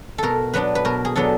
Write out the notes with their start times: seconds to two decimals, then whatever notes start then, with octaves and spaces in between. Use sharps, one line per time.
0.18 B2 A4 A#4
0.54 F#3 B3 D4 B4
0.75 B4
0.85 B2 A#4
1.05 G#4
1.16 F#3 B3 D4 A4